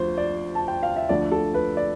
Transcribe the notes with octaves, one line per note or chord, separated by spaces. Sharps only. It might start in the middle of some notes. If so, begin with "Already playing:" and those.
Already playing: D2 F3 C5
D5
A5
G5
F5
E5
D2 D3 F3 D5
A4
B4
D5